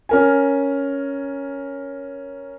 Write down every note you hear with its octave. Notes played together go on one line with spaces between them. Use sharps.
C#4 A#4 G#5